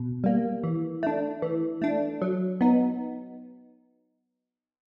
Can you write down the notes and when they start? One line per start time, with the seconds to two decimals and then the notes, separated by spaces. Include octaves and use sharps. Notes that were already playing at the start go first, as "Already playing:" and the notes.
Already playing: B2
0.24 G3 A#3
0.64 E3
1.03 A3 D4
1.42 E3
1.82 A3 D4
2.22 F#3
2.61 B3 D#4